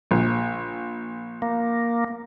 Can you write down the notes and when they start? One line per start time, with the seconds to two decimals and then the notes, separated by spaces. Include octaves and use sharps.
0.11 A#1
1.42 A#3